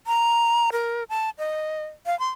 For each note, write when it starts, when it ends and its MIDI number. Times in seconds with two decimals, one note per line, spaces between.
0.07 0.70 82
0.72 1.04 70
1.10 1.30 81
1.38 1.85 75
2.06 2.18 77
2.19 2.29 84